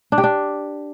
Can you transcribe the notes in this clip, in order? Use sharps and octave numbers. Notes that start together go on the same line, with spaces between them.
D4
G4
D4